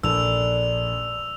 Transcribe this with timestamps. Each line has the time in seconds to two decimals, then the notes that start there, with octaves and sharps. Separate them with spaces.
0.03 A#1 D4 A4 E6 F7